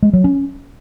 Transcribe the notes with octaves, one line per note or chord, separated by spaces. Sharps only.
G#3
F#3
C#4